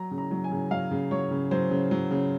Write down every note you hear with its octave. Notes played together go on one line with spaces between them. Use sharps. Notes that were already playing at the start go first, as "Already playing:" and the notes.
Already playing: F#3 A#5
C#3
A#5
F#3
G#5
C#3
F#3 F5
C#3
F#3 C#5
C#3
F#3 C5
C#3
F#3
C#3